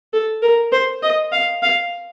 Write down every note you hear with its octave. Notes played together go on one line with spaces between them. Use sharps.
A4
A#4
C5
D#5
F5
F5